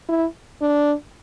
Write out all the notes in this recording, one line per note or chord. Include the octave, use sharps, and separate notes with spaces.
E4
D4